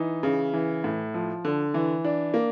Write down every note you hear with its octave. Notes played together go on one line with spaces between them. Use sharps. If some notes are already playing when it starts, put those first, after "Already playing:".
Already playing: E3 D#4
C#3
E3
A2
F3
D3
E3
D4
A#3